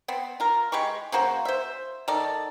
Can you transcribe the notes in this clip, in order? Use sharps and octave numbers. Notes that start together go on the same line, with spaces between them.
B3 C4
F4 A#4
G#3 G4 B5 C#6
C#3 A#3 F#4 C5
C5 E5
D#3 A4 D5